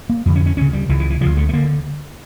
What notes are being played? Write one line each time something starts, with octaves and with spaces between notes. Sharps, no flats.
A#3
F2 D3
C#4
C#4
D2 C#3 C#4
G3
C#2 C#3 E3
E3
E3
D2 C#3 F3
A3
A3
D3 A#3